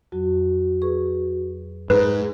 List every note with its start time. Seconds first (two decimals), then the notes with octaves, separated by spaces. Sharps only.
0.12 F2 F#3 F#4
0.82 G#4 B4 C#6
1.90 G#2 G#4 B4